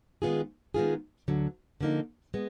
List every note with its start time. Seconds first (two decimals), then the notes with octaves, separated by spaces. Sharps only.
0.22 D#3 G#3 B3 F4 G#4
0.74 D#3 G#3 B3 F4 G#4
1.28 D2 D3 F#3
1.81 D3 F3 A#3 D#4
2.34 G#3 B3